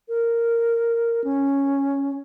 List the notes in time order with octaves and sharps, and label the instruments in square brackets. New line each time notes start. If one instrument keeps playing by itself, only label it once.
[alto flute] A#4
C#4